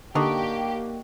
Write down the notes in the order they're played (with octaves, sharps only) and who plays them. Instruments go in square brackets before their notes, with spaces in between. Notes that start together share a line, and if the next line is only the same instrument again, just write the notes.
[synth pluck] D3 [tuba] A#3 [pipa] D4 D#4 F#4 [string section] G4